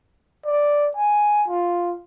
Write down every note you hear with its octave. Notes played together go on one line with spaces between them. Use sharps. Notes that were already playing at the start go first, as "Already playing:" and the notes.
D5
G#5
F4